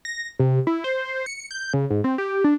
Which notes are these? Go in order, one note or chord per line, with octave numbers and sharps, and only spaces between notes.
A#6
C3
E4
C5
C#7
G6
C#3
G#2
C4
G4
D4